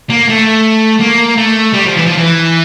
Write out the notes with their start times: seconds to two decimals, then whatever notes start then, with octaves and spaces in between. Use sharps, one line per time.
0.10 A#3
0.29 A3
1.00 A#3
1.37 A3
1.74 G3
1.86 F3
1.97 E3
2.07 F3
2.17 E3